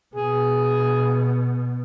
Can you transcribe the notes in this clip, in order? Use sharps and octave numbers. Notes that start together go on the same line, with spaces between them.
B2 G#4